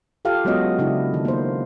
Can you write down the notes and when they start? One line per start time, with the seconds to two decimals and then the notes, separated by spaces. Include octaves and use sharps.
0.25 F4 G4 A4 F5
0.45 F#3 G#3 B3 C#4 F#4 D#5
0.79 C#3 D4 E4
1.14 D#3
1.25 A#3 C5